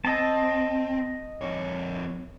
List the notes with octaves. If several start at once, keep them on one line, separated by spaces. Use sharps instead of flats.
C4 D#5 A5
F2 C#5